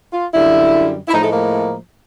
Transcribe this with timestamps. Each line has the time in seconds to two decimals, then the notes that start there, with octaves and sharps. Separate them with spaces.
0.13 F4
0.33 F#2 D3 G3 E4
1.08 E4
1.13 A2 F3 G#3 D#4
1.24 A3
1.33 A#3